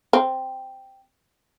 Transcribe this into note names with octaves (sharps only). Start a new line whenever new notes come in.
C4